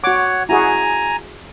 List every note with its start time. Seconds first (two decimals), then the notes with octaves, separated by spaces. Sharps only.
0.04 F#4 C#5 F#5 D6
0.49 E4 F#4 G#4 G#5 A#5